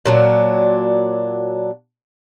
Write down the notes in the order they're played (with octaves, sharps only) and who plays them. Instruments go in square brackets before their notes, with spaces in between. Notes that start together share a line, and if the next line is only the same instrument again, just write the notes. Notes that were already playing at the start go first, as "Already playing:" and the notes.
[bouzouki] A#2 F#3 D4